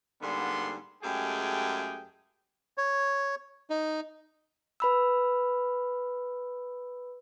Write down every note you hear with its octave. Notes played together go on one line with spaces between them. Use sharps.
G#2 D3 G3 A#3 B3 C6
F#2 G#3 A3 G4 G#4 G5
C#5
D#4
B4 B5 E6